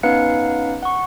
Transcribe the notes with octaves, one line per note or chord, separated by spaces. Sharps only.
B3 C#4 D#4 B4 F5 C#7
F#5 C#6